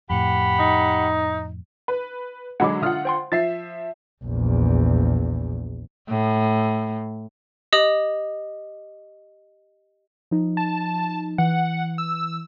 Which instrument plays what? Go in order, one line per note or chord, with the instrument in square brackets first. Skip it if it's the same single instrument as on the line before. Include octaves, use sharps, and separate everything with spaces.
[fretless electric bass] F2 A2 [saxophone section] G4 F#5 [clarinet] B5
[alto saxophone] D#4
[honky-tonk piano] B4
[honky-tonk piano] D3 F#3 G#3 [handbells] F#5 B5 D6
[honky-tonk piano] D3 F4 F#5 [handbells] E5 D#6 F6
[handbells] C5 G5 C6
[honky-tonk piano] F3 E5 C7 [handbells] A6
[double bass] A#1 E2
[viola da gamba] A2
[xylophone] G4 D#5 D#6 F#7
[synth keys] F3 D#4
[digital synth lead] A5
[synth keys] E3 [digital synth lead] F#5
[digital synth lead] E6